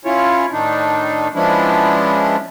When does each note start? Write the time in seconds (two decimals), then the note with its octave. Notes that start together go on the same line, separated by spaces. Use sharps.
0.05 C#4 E4 F4 C#5
0.52 A2 D#3 D4 D#4
1.35 F3 G#3 B3 C#4 D4 E4